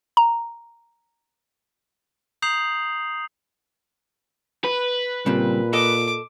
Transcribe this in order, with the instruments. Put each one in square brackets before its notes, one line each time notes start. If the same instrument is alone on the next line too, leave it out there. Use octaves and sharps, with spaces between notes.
[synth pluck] A#5
[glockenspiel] A#5 D#6 G6 C7 F7 F#7
[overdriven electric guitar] B4
[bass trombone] A#2 [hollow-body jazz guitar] C#3 G3 C4
[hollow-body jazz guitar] A4 D#5 [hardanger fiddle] D6